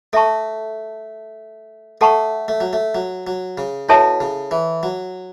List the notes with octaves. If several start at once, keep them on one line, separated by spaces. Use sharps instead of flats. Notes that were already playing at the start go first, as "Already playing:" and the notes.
A3 A4 E5 A5 C#6
A3 A4 F#5 A5 C#6
A3
F#3
A3
F#3
F#3
C#3
B2 E4 A4 C#5 E5 A5
C#3
E3
F#3